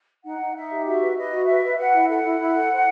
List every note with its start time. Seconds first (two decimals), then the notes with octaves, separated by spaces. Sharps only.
0.23 D#4 F#5
0.39 D#4
0.54 D#4 E5
0.70 G4
0.85 F#4 E5
1.01 B4
1.16 B4 D#5
1.31 F#4
1.47 B4 E5
1.62 B4
1.77 B4 F#5
1.93 E4
2.08 A4 F#5
2.23 E4
2.39 E4
2.54 A4
2.70 C5